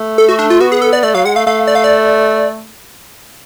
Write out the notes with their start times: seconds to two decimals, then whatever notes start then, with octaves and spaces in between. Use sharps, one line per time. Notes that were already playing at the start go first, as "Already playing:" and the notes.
Already playing: A3
0.18 A4
0.29 F#4
0.39 D4
0.50 F4
0.60 B3 F#4
0.72 G#4
0.82 A4
0.93 D5
1.03 A3 D5
1.14 F#3 F5
1.25 G#3 F#5
1.36 A3 F5
1.46 A3 F5
1.67 D5
1.75 F5
1.84 D5